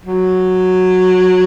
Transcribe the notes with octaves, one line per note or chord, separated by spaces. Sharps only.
F#3